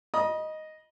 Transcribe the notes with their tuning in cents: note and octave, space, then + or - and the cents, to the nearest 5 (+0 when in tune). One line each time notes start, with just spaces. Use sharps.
D#5 +0 B5 -40 D#6 +0